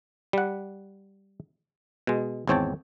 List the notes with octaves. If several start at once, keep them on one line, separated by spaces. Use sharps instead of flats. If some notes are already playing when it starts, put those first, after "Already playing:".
G3 F#5
B2 G#3
G#1 E2 C4 C#5 G5 A5